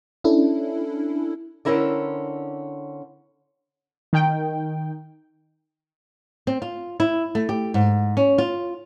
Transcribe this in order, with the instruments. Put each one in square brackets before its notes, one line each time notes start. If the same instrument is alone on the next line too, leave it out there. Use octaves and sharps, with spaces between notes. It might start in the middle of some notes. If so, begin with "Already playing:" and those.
[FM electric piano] C#4 D4 E4 A4
[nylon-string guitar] D3 C4 C#4 E4 A#4 D5
[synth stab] D#3 G5
[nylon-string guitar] C4
F4
E4
A3
G4
G#2
C#4
F4